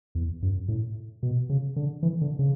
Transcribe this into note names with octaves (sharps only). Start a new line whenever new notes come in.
E2
F#2
A2
B2
C#3
D3
E3
D3
C#3